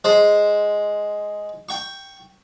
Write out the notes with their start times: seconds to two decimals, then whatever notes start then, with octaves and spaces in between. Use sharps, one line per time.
0.04 G#3 C5
1.69 G5 C#6